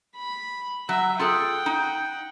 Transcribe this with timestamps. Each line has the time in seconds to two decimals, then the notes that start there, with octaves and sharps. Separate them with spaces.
0.16 B5
0.89 F#3 E5
1.19 F4 G#4 A4 F#5 G5
1.66 D#4